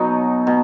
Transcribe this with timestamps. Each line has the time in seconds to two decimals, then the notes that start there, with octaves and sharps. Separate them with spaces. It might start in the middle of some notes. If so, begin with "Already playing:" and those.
Already playing: B2 F#3 D#4
0.47 B2